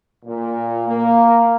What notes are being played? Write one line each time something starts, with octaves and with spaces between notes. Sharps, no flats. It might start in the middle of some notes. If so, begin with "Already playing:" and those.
A#2
A#3